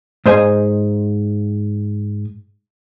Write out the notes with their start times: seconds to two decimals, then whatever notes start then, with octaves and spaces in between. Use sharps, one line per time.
0.26 G#2 C5 D#5 G#5